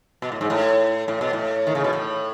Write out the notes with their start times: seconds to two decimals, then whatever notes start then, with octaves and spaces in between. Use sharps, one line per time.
0.22 B2
0.32 A2
0.41 G#2
0.50 A2
1.08 A2
1.21 B2
1.33 A2
1.67 D#3
1.75 C#3
1.84 B2
1.93 A2